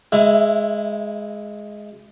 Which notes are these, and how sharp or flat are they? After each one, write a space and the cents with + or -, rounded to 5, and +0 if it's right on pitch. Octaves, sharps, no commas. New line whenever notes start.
G#3 +5 E4 +0 E5 +35